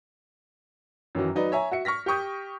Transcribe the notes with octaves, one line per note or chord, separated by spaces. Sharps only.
F#2 D#3 E3 F#3
F#3 D#4 B4 D5
C#5 E5 G#5 A#5
F#4 E5 C#7
C#6 F6 A#6 B6
G4 G5 C#6 D#6 G6